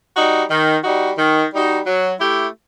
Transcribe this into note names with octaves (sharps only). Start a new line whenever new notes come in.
G3 D#4 F#4
D#3
G3 D#4 F#4
D#3
G3 D#4 F#4
F#3
A3 E4 G4